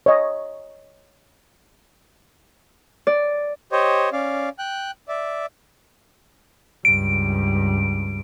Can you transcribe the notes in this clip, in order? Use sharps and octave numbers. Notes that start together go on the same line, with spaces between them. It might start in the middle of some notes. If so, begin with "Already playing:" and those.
C#5 D#5
D5
G4 C5 C#5 D#5
C#4 D5 F5
G5 F#6
D5 E5
C#2 G2 D7